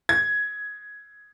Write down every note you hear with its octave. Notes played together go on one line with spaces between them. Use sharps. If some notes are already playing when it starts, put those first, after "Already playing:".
G#6